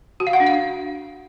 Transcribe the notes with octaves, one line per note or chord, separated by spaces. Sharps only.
F#4
F5
F#5
D4
F5